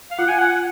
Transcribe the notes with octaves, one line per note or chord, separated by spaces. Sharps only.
F5
F4 F#5
G#5
F#5
F#5